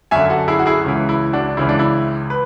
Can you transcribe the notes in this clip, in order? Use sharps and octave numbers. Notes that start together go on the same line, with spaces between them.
F#2 D3 E5 G#5
F#4 A4
E4 G#4
F#4
E4 G#4
C#2 C#3 E3
E4
D4 F#4
C#2 C#3 E3 E4
D4
E4
B4